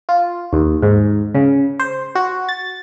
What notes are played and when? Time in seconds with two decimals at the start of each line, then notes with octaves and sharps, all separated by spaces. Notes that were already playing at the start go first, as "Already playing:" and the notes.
0.09 F4
0.53 D#2
0.82 G#2
1.35 C#3
1.79 C5
2.15 F#4
2.49 A6